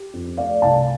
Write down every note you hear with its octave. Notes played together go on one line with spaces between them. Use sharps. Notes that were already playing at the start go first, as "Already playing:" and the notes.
Already playing: G4
F2
A3 D5 F5
C2 F5 A5